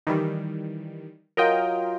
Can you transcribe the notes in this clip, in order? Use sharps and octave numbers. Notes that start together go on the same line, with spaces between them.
D#3 E3 G3
F#3 F4 A#4 D#5 F5 G5